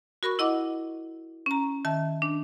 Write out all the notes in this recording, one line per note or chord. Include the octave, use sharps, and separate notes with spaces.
F#4 A#4 B5 C#6
E4 D#5 F#5 D6
C#4 A#5
D#3 E5 A5
D4